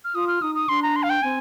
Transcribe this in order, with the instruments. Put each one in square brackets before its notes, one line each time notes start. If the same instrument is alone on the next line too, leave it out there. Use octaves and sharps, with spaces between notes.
[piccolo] F6
[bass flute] F4 [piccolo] D#6
[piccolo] F6
[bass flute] D#4 [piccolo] D#6
[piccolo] D#6
[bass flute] D4 [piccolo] C6
[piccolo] A#5
C6
F5
G5
[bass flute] C4 [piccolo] G#5